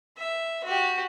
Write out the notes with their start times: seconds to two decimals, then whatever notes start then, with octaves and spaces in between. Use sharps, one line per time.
0.17 E5
0.64 F#4 G4